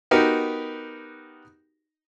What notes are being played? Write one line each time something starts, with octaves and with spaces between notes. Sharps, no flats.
B3 D#4 F#4 G4 A#4